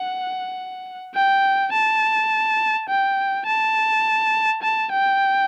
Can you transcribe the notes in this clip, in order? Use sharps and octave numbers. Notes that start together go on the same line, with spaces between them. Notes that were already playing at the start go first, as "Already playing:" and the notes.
Already playing: F#5
G5
A5
G5
A5
A5
G5